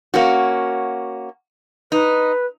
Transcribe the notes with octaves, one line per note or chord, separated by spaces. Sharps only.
A#3 C#4 F#4
D#4 B4